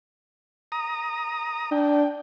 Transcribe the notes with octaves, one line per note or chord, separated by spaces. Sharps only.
A#5 D#6
D4 G5